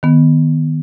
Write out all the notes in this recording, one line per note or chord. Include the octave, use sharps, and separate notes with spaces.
D#3 B3